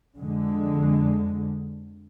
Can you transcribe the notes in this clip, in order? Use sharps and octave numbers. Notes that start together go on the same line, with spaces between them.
F2 D3 G#3